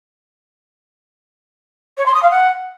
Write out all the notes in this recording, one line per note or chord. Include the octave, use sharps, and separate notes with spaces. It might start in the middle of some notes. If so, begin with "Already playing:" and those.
C#5
C6
D#6
F5
F#5